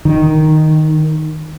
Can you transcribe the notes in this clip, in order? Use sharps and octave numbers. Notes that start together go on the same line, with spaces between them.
D#3